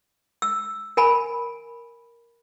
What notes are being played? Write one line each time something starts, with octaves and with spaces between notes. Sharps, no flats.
E6
A#4 G#5 B5